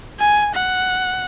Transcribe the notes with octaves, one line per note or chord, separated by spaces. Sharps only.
G#5
F#5